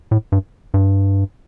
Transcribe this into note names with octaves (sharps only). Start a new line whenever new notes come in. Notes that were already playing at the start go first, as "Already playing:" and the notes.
A2
G2
G2